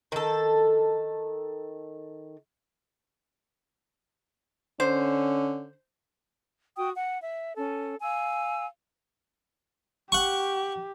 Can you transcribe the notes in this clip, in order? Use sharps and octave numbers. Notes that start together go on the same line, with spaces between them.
D#3 A4
D3 C#4 C5
F#4 G5 D#6
F#5
E5
C#4 A4
F5 G#5 E6
G4 F#5 C#6